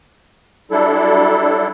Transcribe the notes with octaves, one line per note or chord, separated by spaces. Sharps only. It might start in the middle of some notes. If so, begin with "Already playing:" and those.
F#3 G3 D4 E4 A4